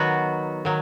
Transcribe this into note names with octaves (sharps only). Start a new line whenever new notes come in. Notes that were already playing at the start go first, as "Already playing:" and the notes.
Already playing: D#3 F#3 B3 F#4
D#3 F#3